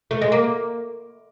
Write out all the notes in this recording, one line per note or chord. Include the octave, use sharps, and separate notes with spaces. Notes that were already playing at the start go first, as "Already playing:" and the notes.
A3
G#3
A#3